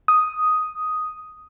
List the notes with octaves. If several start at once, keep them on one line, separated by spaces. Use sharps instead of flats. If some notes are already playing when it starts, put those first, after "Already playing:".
D#6